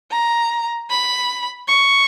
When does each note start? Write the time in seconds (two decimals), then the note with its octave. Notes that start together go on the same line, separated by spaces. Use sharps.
0.11 A#5
0.90 B5
1.68 C#6